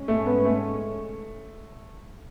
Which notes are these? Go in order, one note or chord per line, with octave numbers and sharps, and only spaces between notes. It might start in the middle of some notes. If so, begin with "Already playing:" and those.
Already playing: G#2 G#3 C#4
A3
B3
A3